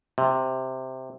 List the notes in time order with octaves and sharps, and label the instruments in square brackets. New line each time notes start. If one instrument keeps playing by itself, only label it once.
[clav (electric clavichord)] C3